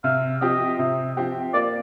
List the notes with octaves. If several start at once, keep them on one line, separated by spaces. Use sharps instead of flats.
C3 F5
F3 C4 G4 D#5
C3
F3 C4 G4
A#3 D5